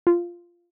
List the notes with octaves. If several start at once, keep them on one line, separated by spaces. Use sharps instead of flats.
F4